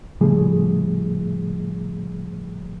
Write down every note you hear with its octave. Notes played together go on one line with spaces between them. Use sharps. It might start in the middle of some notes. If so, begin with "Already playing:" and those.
A2 C#3 F3 G3 A3 G#4